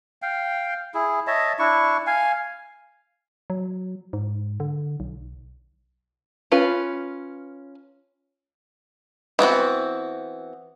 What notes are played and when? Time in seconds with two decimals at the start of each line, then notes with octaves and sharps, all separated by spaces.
0.22 F5 G5
0.94 E4 G#4
1.27 C#5 D#5 E5 A5
1.59 D4 E4 C#6
2.07 F5 G#5
3.50 F#3
4.13 G#2
4.60 D3
5.00 B1
6.52 C#4 F4 B4
9.39 E3 B3 C4 F#4